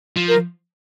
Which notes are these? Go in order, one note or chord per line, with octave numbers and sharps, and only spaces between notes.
F3
A#4